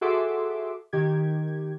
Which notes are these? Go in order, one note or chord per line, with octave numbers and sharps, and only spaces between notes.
F#4 G#4 A4 E5 C6 D6
D#3 G4 G#6